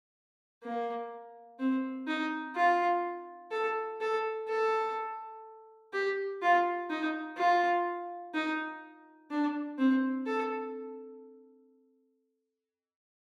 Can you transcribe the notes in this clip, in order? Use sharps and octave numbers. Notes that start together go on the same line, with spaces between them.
A#3
C4
D#4
F4
A4
A4
A4
G4
F4
D#4
F4
D#4
D4
C4
A4